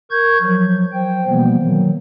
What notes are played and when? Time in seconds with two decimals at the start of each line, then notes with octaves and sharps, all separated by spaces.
0.11 A#4 C#6 G6 G#6
0.42 F3 F#3
0.93 C5 G5
1.27 B2 E3 F3 G3 A#3 B3
1.62 D#3 F#3